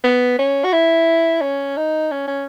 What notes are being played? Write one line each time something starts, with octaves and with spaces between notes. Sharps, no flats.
B3
C#4
F#4
E4
C#4
D#4
C#4
C#4